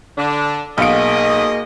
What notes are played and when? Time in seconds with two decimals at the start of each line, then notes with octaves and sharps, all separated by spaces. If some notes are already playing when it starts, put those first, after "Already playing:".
0.18 D3 D4
0.78 B1 G#3 A#3 D#5 F5 D7